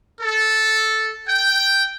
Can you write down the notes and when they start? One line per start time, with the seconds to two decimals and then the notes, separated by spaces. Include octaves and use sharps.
0.20 A4
1.29 G5